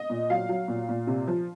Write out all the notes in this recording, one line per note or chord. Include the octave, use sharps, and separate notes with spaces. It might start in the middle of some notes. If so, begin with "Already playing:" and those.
Already playing: D#5
A#2
F#3 F5
F#3
A#2
A#2
C3
F3